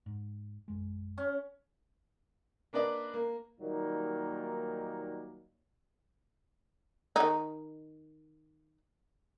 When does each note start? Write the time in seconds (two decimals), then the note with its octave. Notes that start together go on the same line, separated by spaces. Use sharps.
0.06 G#2
0.68 A#1 F#2 G#3
1.18 C#4
2.73 A#3 D4 B4 D5 D#5
3.14 A#3
3.59 A#2 D#3 F#3 G3 A#3 D#4
7.16 D#3 D#4